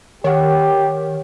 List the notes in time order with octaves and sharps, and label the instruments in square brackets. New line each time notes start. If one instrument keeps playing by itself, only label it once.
[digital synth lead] D#3 [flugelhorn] G4 [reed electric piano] C#5 F#5